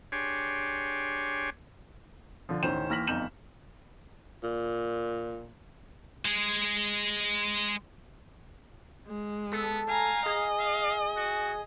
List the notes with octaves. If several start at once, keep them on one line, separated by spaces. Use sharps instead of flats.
D4 G4 G#4 C#5 G#5 C6
D3 F3
A1 D2 D#3 C#4 C5 E7
D#2 E3 F6 A#6 B6 F#7
G1 F2 D#4 G6 E7 F#7
A#2
G#3 G#4
G#3
B3 A4
F5 G#5 A#5
G#4 D#5
F5
F#4